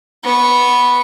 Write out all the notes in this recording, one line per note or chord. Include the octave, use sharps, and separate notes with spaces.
B3 C#6